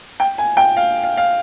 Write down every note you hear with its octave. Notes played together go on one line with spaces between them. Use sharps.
G5
G#5
G5
F5
F5
F5